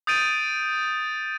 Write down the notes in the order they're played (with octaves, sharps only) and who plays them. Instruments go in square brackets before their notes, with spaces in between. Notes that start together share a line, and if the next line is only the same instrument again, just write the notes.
[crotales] D#6 G6 A6 D7 D#7